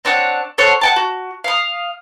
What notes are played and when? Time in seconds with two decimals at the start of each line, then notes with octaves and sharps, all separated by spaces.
0.05 C4 D4 C#5 F#5
0.58 A4 C5 C#5 F#5
0.81 F#5 G5 A5
0.96 F#4
1.44 F5 D#6